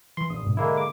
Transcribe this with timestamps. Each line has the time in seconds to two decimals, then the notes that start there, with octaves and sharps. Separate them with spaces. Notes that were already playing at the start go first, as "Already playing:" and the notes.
0.17 E3 C6
0.30 A#1 D#6
0.43 G#2 B2
0.57 D3 G#3 A#3 E4 A#4
0.77 D6